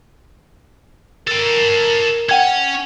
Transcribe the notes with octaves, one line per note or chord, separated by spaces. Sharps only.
A4 A#4 G5
C#4 F#5 G5 G#6